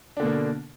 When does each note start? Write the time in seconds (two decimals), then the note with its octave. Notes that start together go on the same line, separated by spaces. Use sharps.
0.17 D4
0.20 D3
0.23 B2
0.25 A#3